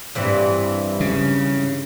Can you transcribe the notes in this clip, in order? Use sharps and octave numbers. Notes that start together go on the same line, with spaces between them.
G2 E3 C4
C#3